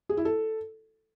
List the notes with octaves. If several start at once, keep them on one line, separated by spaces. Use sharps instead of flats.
G#4
E4
A4